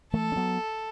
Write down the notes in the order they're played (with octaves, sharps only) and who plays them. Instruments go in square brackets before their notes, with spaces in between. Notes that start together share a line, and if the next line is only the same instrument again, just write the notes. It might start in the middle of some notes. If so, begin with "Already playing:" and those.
[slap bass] E3 A3 [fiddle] A4
[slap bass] C#4
F#3 B3